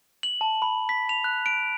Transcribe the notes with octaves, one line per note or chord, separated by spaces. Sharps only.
F#7
A5
B5
B6
F7
F#6
D7